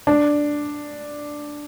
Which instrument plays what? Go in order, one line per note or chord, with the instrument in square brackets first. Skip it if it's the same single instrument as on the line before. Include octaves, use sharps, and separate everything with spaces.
[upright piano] D4